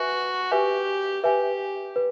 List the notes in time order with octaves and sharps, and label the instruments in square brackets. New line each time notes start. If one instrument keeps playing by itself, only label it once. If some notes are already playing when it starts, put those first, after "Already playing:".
Already playing: [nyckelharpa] F#4 [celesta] B4 E5 G#5
[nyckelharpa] G4 [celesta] B4 E5 G#5
[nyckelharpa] G4 [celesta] B4 E5 G#5
[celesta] B4